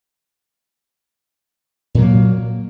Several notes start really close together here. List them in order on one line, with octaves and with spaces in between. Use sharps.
A#2 F#3 A#3